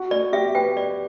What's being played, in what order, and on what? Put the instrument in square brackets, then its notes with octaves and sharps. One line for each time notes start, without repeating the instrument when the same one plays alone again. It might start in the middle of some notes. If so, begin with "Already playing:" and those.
Already playing: [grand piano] F#4
[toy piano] D5
[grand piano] G4 [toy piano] E5
[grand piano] B4 [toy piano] G5
[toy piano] D5